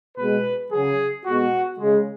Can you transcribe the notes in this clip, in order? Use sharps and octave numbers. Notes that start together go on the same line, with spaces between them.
B2 G#3 B4
C#3 F#3 G#4
B2 G#3 F#4
C#3 G#3